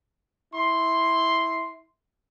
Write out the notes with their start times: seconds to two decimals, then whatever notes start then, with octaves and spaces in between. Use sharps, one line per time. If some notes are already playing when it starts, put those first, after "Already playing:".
0.54 E4 C6